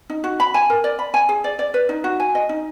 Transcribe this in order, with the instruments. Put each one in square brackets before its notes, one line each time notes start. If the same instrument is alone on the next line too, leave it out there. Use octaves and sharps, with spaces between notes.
[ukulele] D#4
F#4
B5
G#5
A#4
D5
B5
G#5
G#4
D5
D5
B4
D#4
F#4
G#5
D#5
D#4